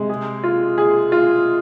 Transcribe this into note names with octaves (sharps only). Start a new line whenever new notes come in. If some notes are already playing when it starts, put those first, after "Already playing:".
Already playing: C3 G#3
G#4
F4
G#4
F4